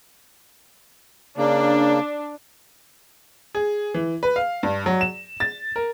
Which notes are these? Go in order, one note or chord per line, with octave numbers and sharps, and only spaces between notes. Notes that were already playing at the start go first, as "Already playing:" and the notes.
C#3 A#3 D4
G#4
E3
B4
F5
G2
F#3
E7
A6
A#4